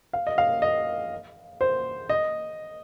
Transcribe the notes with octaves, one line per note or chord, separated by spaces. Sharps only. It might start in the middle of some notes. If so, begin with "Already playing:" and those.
F5
D#5
F5
D#5
C5
D#5